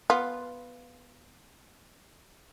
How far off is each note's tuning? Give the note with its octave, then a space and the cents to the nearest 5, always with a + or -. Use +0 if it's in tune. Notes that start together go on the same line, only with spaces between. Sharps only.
B3 +0 F4 +0